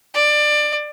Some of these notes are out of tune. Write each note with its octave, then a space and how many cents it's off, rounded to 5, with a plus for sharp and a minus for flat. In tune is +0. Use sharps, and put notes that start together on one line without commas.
D5 +20